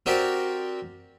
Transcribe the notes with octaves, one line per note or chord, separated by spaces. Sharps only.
C4 F#4 G4 A#4 D5